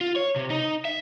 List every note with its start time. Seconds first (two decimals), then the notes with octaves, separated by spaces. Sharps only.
0.01 F4
0.16 C#5
0.36 C3
0.50 D#4
0.85 E5